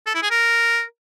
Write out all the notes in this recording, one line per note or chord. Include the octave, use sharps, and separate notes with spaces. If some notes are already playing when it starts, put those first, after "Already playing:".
A4
E4
G#4
A#4